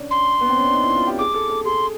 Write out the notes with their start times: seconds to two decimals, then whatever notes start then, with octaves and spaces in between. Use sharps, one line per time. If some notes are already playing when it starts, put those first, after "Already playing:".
Already playing: C#4 D4
0.11 C6
0.41 B3
0.49 C4
0.57 C#4
0.65 D4
0.73 D#4
0.83 E4
0.96 F4
1.07 G4
1.19 G#4 D6
1.34 A4
1.50 A4
1.65 G#4 C6